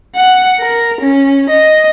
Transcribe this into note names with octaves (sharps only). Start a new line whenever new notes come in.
F#5
A#4
C#4
D#5